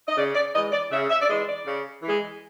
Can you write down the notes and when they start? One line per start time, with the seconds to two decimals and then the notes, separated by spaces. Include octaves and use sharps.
0.08 D#5
0.17 C#3 D5
0.35 D5
0.54 E3 G#3 D#5
0.72 D5
0.91 C#3 E5
1.10 E5
1.21 D5
1.29 E3 G#3 D#5
1.48 D5
1.66 C#3
2.03 E3 G#3